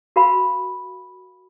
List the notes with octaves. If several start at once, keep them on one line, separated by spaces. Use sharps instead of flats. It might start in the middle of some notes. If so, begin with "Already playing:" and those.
F#4 A#4 F5 B5